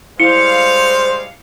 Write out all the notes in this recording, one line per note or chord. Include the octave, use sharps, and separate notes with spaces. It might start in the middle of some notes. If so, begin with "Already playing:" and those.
G3 G#3 E4 C5 F5 C#7